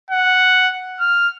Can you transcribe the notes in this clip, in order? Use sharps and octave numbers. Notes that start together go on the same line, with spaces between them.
F#5
F6